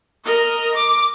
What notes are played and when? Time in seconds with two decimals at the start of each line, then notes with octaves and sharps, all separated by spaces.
0.25 A#4 D#5
0.75 D6